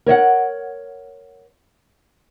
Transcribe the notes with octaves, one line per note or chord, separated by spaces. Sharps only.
A#4 C#5 E5 F#5